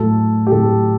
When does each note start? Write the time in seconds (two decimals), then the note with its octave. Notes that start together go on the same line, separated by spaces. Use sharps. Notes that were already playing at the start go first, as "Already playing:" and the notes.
Already playing: A2 F#3 A3 A4
0.47 G4
0.52 A2 F#3 A3 A4